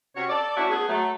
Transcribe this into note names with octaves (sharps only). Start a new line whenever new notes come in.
C3 C#4 F#4 C#5
A4 D5
A3 C#4 E4 F#4
A3 B3 G#4
F#3 A3